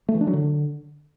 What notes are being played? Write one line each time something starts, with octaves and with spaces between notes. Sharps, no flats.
A3
E3
D4
F#3
D3